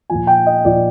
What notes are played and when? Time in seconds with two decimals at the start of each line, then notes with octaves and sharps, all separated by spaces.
0.10 A#2 F3 G#5
0.27 G5
0.46 D#5
0.65 A#2 F3 D5